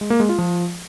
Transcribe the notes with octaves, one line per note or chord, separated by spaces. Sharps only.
G#3
A#3
G#3
F4
F3